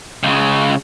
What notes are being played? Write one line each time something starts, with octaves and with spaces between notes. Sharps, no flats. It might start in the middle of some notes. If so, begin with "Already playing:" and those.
C#2 C#3